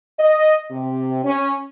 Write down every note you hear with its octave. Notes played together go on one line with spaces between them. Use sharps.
D#5
C3
C#4